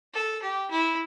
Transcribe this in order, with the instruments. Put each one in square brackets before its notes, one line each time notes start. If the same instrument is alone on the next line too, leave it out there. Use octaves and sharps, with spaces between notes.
[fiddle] A4
G4
E4